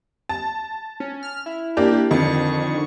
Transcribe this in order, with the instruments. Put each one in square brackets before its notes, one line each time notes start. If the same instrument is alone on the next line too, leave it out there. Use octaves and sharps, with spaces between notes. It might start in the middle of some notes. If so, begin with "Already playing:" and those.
[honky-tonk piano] A5
[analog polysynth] C#4
F6
E4
[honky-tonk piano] A#3 D4 G4
[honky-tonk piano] F2 [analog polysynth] D3 D#3 C#6